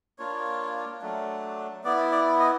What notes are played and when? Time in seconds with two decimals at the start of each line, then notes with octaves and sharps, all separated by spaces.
0.18 A#3 D4 F4 C#5
1.01 F#3 A3 D4
1.84 B3 E4 D5
2.12 D5
2.40 D#5